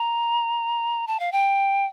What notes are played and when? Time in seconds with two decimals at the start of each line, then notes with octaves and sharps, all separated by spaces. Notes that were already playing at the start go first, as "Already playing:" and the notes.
Already playing: A#5
1.07 A5
1.20 F5
1.32 G5